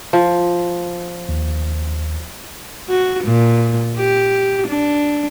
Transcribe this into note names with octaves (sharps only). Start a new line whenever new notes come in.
F3
D#2
F#4
A#2
G4
D4